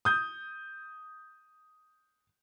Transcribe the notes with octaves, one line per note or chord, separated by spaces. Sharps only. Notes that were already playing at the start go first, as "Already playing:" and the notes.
D#6 G6